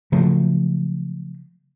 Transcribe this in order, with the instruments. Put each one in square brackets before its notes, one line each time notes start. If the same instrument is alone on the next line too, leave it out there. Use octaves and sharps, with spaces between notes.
[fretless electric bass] C#3 F3 F#3 A3